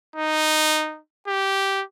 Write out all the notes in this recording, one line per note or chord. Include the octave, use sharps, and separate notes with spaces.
D#4
G4